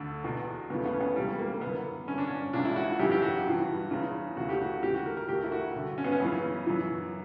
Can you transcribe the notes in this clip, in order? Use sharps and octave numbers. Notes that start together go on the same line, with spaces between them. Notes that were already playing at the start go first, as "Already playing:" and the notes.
Already playing: D2 D3
E2 B2
D2 C#3 E3 B3
B3
C#4
B3
C#2 C#3 E3 G3
A#3
A#3
F#2 D3 B3
G2 D3 C#4
D4
C#4
C#2 C#3 E3 D4
E4
F#4
F#4
F#2 C#3 E3 G4
G4
F#4
G2 E3
E2 C#3 E3
D2 C#3 E3 F#4
G4
F#4
D2 C#3 E3 G4
F#4
A#4
A#4
D2 C#3 E3 G4
E4
F#4
G2 D3
C#4
B3
C#4
F#2 C#3 E3 B3
F#2 E3